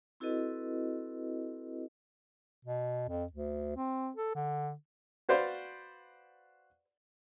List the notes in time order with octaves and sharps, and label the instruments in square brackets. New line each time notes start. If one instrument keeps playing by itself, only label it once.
[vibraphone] C4 E4 F#4 A4 B4 D#5
[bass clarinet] B2
F2
D2
C4
A4
D3
[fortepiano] F#4 B4 C5 D5 F5